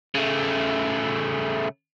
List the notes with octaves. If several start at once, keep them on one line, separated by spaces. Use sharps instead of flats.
C#3 A3